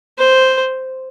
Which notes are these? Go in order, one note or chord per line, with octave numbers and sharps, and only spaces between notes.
C5